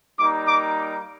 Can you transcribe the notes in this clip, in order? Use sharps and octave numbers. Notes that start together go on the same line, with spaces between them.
G3 A#3 D#4 D6
D6